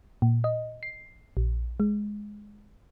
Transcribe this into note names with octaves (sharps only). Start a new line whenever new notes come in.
A#2
D#5
C7
A#1
G#3